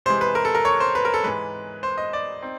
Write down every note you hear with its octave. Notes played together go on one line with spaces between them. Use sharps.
C3 E3 G#3 C5
B4
A#4
A4
A#4
C#5
C5
B4
A#4
A4
G#2 E3 G#3 B4
C5
D#5
D5
C4 D#4